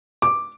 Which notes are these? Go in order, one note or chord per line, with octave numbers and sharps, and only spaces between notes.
D6